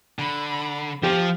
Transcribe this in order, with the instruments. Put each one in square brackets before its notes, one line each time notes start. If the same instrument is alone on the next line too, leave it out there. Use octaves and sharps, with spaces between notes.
[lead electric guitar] D3 [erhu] B5
[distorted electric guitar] F3 [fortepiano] G4